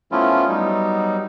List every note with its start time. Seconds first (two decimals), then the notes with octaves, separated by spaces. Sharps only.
0.12 F3 A3 B3 C#4 E4 F4
0.48 F#3 G3 B3 D#4